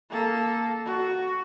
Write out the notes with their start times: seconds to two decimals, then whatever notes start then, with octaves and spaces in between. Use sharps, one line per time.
0.10 A#3 A4
0.85 F#4